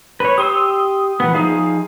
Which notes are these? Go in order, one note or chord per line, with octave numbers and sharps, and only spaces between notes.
B4 C#5
G4 C6 D#6 E6
A#2 E3 B3
F3 D#4 G#4 F5